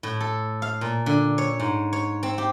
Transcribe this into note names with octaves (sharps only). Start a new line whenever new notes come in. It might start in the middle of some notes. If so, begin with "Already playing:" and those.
A2
A4
F5
A#2
D3
C#5
G#2
C#5
C4
G4